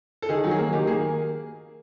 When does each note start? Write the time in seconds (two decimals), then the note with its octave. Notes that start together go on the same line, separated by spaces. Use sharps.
0.22 A4
0.29 D#3 G#4
0.44 F#3
0.51 G#4
0.59 A#3
0.73 D#3 G4
0.87 A#3 G#4